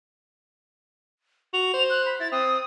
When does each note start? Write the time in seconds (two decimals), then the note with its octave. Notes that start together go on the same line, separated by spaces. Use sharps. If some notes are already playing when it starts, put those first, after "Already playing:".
1.54 F#4 F7
1.74 C5
1.90 F#6
2.06 B5
2.20 E4 A6
2.32 C4 D#6